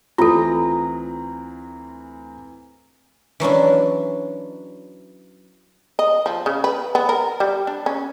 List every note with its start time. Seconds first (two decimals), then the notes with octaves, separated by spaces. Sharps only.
0.18 D2 E3 C4 F4 A4 A#5
3.40 E3 F#3 C#4 D4
5.99 D#5
6.26 F3
6.46 C#3
6.64 B4
6.95 B3
7.09 A#4
7.40 G3
7.67 D4
7.86 C#4